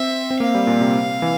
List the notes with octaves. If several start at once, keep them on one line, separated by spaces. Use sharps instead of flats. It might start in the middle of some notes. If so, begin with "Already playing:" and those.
Already playing: C4 E5
C4
A#3 F5
G3
A#2
C3
E3